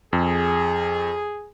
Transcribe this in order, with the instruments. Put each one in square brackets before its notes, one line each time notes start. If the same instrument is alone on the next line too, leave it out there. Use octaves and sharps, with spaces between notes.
[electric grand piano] F2 [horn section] G#4